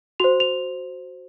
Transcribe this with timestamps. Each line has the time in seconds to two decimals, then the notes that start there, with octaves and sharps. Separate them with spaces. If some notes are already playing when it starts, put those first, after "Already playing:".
0.20 F#4 C5 F7
0.40 F7